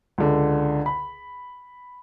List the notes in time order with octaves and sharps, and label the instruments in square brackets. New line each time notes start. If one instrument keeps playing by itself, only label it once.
[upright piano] C#2 D3
B5